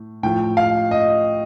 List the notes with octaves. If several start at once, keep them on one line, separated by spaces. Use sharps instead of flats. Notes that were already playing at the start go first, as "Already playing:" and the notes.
Already playing: A2
A2 F3 G5
F5
D#5